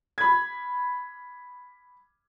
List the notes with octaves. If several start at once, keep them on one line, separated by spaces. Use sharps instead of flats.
B5 G#6